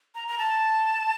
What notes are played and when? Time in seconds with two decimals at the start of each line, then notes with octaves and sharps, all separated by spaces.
0.15 A#5
0.28 A#5
0.38 A5